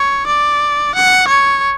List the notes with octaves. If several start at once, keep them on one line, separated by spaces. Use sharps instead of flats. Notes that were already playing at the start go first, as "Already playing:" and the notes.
Already playing: C#5
D5
F#5
C#5